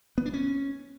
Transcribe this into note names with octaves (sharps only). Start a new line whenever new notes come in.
B3
D4
C#4